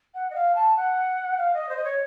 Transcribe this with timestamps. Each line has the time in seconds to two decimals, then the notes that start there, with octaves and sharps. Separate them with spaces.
0.14 F#5
0.30 D#5
0.34 F5
0.55 A5
0.76 F#5
1.37 F5
1.53 D#5
1.69 C5
1.76 D#5
1.84 C#5